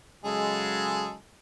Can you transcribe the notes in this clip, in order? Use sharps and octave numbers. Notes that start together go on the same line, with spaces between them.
C#3 F#3 G#3 G#4 A4